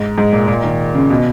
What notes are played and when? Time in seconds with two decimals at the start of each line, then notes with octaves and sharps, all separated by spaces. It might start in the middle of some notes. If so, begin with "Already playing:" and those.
Already playing: G#2
0.18 G#2
0.33 A#2
0.48 A#2
0.64 D#3
0.95 C#3
1.10 B2